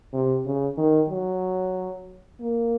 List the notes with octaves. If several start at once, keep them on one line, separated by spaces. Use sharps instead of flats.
C3
C#3
D#3
F#3
A#3